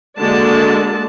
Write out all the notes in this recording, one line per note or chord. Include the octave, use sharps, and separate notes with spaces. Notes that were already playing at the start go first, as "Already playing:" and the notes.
D3 G#3 A#3 F#4 D5 A5